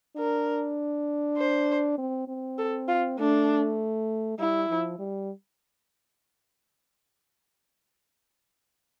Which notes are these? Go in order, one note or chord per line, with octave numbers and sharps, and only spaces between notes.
D4 A#4
C5
C4
C4
A4
F4
A3 D4
G3 E4
F3
G3